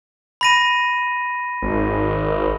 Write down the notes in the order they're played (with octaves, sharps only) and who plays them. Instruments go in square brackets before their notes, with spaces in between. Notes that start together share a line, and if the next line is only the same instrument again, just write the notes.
[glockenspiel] B5 A#6 D#7
[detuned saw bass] G#1